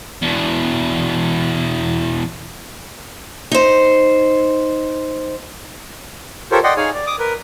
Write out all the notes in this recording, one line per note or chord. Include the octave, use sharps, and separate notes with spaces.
E2 B2
D#4 C5
F4 G4 A4 A#4 C5 C#5
D5 D#5 F#5 G5 C6
D#4 G#4 C#5 F5 G#5
D5
D6 D#6
A#4 B4